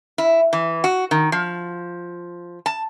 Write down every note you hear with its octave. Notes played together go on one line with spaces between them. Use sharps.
E4
E3
F#4
D#3
F3
A5